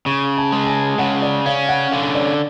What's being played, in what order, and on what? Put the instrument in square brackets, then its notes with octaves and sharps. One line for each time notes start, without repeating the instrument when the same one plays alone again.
[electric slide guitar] C#3 [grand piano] C#6
[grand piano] A5
[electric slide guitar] G#3
[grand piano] A5
G#5
[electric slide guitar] C#3 [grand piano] F#5
[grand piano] D5
[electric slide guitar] C#4 [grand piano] F5
[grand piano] F#5
[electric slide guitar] D3 [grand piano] F5
[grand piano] D5